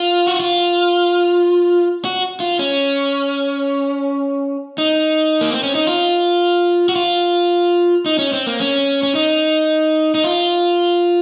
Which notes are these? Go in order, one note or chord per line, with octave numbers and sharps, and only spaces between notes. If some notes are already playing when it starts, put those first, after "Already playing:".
Already playing: F4
F#4
F4
F#4
F4
C#4
D#4
A#3
C4
C#4
D#4
F4
F#4
F4
D#4
C#4
C4
A#3
C#4
C#4
D#4
D#4
F4